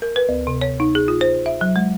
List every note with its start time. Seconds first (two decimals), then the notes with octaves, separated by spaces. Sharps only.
0.02 A#4
0.16 B4
0.29 D2
0.47 C3
0.61 C#5
0.80 D#4
0.95 G#4
1.08 F4
1.21 C5
1.46 E5
1.61 F#3
1.76 G#3